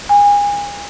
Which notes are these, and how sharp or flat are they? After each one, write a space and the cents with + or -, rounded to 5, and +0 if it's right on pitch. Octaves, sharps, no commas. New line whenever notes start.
G#5 -30